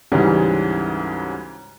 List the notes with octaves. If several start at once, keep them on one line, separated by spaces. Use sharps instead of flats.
D2 G#2 C#3 E3 G3